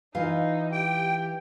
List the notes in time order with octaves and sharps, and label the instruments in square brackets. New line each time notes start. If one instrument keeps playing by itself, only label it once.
[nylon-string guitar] E3 F4 F5 [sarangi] D#4
[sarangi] G4 [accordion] G5